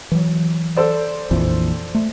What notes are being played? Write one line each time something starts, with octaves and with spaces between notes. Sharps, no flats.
E3 F#3
A4 C5 D5
A#1 F2 E3
A3